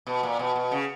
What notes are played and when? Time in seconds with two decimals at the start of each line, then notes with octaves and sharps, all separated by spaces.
0.07 B2
0.23 A#2
0.39 B2
0.56 B2
0.71 C#3